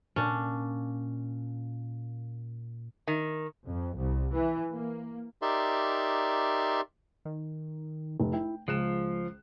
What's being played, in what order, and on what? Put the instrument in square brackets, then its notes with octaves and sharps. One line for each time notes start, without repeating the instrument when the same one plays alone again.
[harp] A#2 [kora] C#4 D4
[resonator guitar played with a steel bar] D#3
[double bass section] F2
C2
E3
A#3
[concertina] D#4 G4 A#4 D5 E5 C6
[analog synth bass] D#3
[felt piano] F1
[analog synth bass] E4 [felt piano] G5
[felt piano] C#2 F#6 E7 [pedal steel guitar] F3 [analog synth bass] G#3